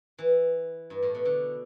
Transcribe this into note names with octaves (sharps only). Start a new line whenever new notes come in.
E3
G2
A2
B2
D3